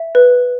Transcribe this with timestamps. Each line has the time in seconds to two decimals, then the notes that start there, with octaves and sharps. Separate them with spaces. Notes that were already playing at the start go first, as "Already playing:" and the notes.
Already playing: E5
0.15 B4